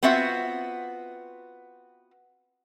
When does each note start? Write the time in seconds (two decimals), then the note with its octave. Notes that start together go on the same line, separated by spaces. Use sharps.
0.03 B3 C4 F4 F#4 E5 F#5